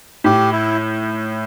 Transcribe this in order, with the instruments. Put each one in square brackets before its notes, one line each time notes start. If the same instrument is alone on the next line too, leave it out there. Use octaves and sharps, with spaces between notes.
[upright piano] A2 [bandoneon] G4
[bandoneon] E4